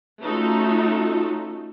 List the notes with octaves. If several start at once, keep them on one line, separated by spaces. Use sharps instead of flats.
A3 C#4 D#4 F4 F#4 A4